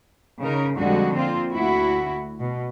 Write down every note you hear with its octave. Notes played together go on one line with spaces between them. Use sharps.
C#3 D#4 A#4
F2 D3 G3 G#3 F#4
A#3 C4 F4
D2 E4 F#4
B2